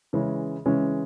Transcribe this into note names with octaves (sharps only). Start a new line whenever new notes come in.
C#3 E3 G#3 C#4
C#3 E3 G#3 C#4